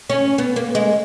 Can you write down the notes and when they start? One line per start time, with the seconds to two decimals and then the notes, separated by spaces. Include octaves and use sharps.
0.10 C#4
0.38 B3
0.56 A#3
0.75 G#3